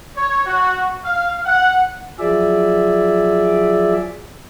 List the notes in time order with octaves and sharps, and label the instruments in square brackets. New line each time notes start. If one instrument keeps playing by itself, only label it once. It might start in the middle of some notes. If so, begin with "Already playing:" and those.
[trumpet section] C#5
F#4
F5
F#5
[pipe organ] F3 F#3 G#4 D5 E5